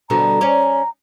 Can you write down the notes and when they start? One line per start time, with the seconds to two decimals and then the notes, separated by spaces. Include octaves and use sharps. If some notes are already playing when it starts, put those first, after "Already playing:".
0.10 B2 D3 G3 A#5
0.41 C#4 D5